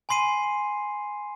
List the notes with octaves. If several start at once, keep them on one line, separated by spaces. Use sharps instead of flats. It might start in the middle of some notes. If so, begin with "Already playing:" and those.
G#5 B5 C6 C7 D#7